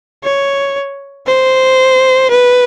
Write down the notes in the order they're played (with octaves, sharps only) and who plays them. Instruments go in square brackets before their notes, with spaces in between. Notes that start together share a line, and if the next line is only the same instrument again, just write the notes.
[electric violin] C#5
C5
B4